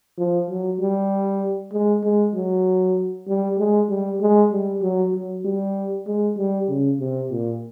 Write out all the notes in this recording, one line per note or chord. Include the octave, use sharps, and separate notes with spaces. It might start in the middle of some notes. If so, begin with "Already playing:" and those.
F3
F#3
G3
G#3
G#3
F#3
G3
G#3
G3
G#3
G3
F#3
F#3
G3
G#3
G3
C#3
C3
A#2